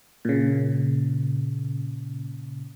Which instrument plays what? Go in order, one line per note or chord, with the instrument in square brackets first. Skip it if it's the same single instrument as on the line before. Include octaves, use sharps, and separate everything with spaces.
[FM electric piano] A#2 C#3